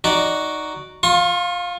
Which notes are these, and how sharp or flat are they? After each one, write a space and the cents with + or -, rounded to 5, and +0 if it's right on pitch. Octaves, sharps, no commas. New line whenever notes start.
D#4 +0 F#4 +0 D5 -10
F4 +15 C#6 -40